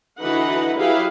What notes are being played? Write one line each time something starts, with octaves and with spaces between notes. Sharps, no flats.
D3 E3 D#4 F#4 B4 F#5
F#3 E4 G4 G#4 B4 F5